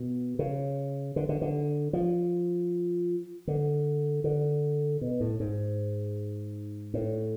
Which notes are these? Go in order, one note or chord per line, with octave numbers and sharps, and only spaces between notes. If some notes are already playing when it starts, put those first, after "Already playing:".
Already playing: B2
C#3
D3
D3
D3
F3
D3
D3
B2
A2
G#2
A2